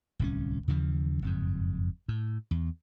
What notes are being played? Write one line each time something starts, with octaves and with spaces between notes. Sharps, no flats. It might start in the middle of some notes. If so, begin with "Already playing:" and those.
D1 C2 C#4
D#2 C#3 E3 F3
F#1 F2 G#2
A2
E2